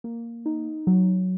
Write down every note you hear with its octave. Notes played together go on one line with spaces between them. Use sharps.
A#3
D#4
F#3